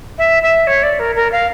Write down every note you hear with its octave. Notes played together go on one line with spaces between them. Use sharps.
E5
E5
C#5
D5
A#4
A#4
F5